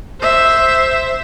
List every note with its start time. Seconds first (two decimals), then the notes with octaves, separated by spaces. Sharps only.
0.20 C5 E5